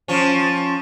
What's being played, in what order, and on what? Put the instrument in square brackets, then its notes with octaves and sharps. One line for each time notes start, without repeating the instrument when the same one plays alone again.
[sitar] F3 C#4